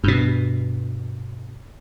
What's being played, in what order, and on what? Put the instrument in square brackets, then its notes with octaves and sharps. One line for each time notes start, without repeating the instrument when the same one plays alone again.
[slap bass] G2 B2